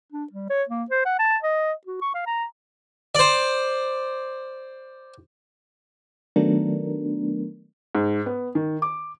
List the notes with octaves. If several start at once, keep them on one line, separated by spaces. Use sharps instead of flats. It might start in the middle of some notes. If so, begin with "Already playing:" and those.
D4
G3
C#5
A#3
C5
F#5
A5
D#5
F#4
C#6
F5
A#5
C5 D5
D#3 F#3 A3 B3 D4 A#4
G#2
B3
D#3
D6